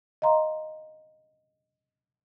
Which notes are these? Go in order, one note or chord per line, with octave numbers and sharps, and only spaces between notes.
D#5 F5 A#5 C6